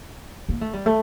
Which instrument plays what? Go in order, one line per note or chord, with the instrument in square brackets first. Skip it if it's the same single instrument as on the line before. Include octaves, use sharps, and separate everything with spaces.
[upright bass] A#3
A3
G3
A3